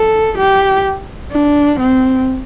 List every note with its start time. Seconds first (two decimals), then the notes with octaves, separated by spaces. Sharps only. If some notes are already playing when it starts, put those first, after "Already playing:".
Already playing: A4
0.38 G4
1.32 D4
1.79 C4